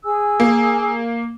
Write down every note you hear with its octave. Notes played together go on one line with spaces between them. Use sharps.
G#4 G#5 E6
A#3